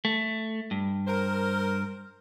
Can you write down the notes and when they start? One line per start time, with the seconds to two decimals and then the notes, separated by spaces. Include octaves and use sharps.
0.05 A3
0.71 G2
1.07 A#4 C5